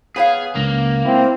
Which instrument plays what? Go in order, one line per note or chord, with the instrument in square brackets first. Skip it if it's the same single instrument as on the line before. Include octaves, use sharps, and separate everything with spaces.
[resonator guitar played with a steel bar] B3 C#5 F5 [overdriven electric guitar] G#4
[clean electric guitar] C#2 [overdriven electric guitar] A#3
[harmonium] C4 [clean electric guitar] E4